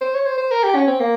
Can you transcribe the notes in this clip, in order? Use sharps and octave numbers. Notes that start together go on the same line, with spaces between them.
C5
C#5
C5
C5
A#4
G4
C#4
C4
A#3